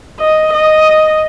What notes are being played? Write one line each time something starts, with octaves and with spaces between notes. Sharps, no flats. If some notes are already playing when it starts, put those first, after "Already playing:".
D#5
D#5